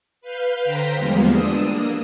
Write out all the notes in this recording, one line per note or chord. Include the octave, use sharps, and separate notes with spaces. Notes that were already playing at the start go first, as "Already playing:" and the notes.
B4 F5 G6
D3 C5 G5 A#5 B6
E2 F3 G3 G#3 A#3 B3
D4 D#6 E6
A#3